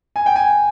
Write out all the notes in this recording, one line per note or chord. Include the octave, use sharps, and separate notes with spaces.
G#5
G5
G#5